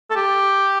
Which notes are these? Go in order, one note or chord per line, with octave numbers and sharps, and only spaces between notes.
A4
G4